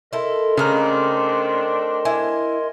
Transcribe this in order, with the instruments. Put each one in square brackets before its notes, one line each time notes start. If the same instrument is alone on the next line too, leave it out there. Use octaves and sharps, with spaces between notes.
[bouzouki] E4 A4 [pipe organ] A#4 D#5 C6
[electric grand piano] C#3 F6 [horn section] A3 C4 D4 [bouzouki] D#4 A#5
[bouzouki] E4 [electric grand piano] G#5